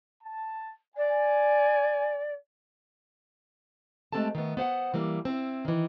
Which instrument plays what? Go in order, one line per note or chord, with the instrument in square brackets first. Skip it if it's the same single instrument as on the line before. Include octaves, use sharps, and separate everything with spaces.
[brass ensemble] A5
[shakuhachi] D5 [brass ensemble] G#5
[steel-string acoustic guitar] G#3 A3 C4 G4 A4 A5
D#3 A3 B3
B3 C5 F5 F#5
E3 G3 A#3
C4 E4 C5
D#3 E3